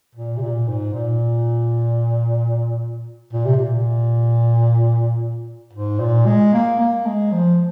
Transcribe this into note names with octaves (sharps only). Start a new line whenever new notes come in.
A#2
C3
A#2
G#2
A#2
A#2
C3
A#2
G#2
A#2
G#3
A#3
A#3
G#3
F3